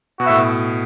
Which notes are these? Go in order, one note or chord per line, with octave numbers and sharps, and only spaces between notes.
B2 F#4 B4 E5
A2
B2